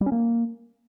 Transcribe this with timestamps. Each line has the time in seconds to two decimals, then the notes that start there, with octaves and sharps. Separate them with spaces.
0.01 G3
0.06 C#4
0.12 A#3